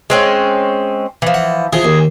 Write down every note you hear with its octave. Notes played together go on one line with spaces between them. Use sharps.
G#3 C4 C#4
E3 F3
F#5
E3 F3 G#4
D#2